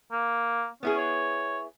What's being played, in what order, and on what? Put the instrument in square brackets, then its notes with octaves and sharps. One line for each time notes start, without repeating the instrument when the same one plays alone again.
[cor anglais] A#3
[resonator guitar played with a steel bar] B3 E4 G#4 [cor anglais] C#4
[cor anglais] C#5